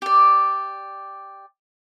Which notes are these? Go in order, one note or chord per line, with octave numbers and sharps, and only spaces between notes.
G4 D5